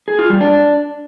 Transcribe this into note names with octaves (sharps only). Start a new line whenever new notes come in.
G#4
F4
G3
D4